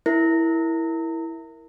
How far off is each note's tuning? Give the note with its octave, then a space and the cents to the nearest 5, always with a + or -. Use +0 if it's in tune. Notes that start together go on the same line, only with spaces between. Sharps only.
E4 -5 A#4 +0